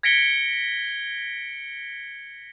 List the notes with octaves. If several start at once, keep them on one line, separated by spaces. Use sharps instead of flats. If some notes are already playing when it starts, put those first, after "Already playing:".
G#6 A#6 B6 C#7 D7 G7